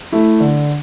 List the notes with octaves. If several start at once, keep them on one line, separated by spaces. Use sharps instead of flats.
A3 E4
D3